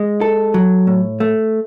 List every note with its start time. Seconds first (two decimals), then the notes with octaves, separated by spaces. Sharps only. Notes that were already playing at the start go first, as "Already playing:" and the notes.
Already playing: G#3
0.21 A4
0.54 F#3
0.87 A2
1.20 A3